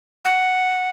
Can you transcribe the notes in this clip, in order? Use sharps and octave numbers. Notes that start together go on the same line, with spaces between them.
F#5